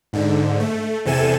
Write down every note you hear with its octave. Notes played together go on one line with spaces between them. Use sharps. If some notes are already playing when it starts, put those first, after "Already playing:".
G#2 D3
A3
E2 C3 A4 G#5 E7